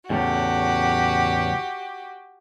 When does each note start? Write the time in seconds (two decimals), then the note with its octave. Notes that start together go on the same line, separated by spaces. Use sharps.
0.10 E2 A2 C#3 F#4 G4